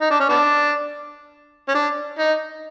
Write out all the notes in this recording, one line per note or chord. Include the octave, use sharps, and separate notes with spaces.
D#4
D4
C#4
B3 D4
C#4
D4
D#4